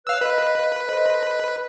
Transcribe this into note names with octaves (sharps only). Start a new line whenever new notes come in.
B4 C#5 F5 E6 F#6
B4 D#5 F5
A4 C5 D#5